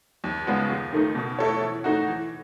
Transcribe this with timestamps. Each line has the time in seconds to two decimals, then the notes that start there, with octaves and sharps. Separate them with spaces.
0.24 D#2
0.47 C#3 G#3 B3 F#4
0.70 D#2
0.93 D#3 A3 D#4
1.15 B2
1.39 A3 E4 A4 C#5
1.61 E3
1.84 A3 D#4 F#4
2.08 E3